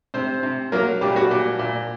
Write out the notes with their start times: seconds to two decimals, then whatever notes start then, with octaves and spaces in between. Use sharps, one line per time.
0.14 C3 C4 C5
0.43 C3
0.72 F#3 A#3 A#4
1.01 A#2 G3 G4
1.16 F#4
1.31 A#2
1.59 A#2